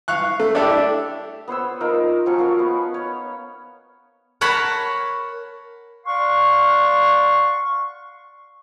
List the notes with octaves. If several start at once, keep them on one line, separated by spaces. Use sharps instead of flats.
F5 C#6 F#6
A3
D4 E4 G4 A4 D5 E5
B3 C5 C#5 E6
D#4 F4 A#4
F3 F#3 C#4 C#6
C#4 A#4 F5
B3
C#5
A#4 C#5 F#5 A5 B5
D5 F5 F#5 C6 C#6